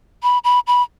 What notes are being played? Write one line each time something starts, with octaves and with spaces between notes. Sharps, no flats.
B5
B5
B5